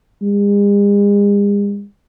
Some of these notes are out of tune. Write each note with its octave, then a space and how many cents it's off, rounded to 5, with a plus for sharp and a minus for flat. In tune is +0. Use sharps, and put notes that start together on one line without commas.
G#3 -45